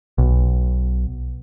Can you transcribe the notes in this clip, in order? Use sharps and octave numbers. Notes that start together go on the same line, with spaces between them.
B1